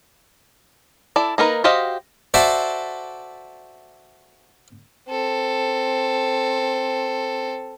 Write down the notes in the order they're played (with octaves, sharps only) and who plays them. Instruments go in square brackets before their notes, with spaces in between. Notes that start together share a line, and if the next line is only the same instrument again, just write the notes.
[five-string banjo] E4 A4 D5
A#3 D#4 A#4 B4
F#4 G4 C5 D#5 F5
[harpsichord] F#4 A4 C5 D5 E5
[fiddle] C4 A4